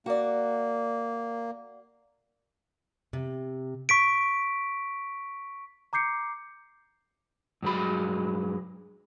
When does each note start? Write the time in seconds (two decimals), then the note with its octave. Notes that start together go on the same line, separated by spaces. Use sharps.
0.06 A#3 F#4 D5
3.13 C3
3.89 C#6 B6 D7
5.93 A#5 D6 G6 C7 C#7
7.62 G2 F#3 G#3 B5